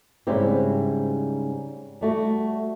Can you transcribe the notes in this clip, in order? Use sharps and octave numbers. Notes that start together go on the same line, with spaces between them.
G#2 C#3 G3 C4 E4 G4
G3 A3 F#4